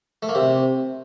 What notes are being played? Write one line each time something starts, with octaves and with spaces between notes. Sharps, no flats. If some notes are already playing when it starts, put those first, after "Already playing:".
A3
A#3
C3